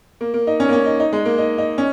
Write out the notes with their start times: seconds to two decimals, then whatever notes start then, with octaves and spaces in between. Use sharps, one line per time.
0.21 A#3
0.34 A#3
0.47 D#4
0.60 C#4
0.69 A#3
0.73 C#4
0.86 D#4
1.00 D#4
1.13 G#3
1.25 A#3
1.38 D#4
1.58 D#4
1.78 C#4